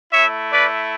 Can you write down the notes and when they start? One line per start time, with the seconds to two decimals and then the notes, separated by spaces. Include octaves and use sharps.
0.12 A3 E4 C#5 E5
0.52 B4 D5